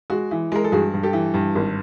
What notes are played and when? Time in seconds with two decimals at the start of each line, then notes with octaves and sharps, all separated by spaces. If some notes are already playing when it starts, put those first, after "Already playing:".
0.10 G#3 F#4
0.31 E3
0.52 G#3 A#4
0.64 A4
0.72 G2 F#4 G#4
0.93 G2
1.03 G4 A4
1.13 E3
1.34 G2
1.55 G#1